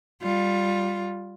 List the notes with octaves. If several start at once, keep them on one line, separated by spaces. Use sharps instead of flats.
G3 F4